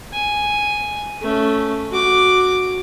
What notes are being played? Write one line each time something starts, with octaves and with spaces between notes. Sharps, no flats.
G#5
A3 C#4
F#4 D6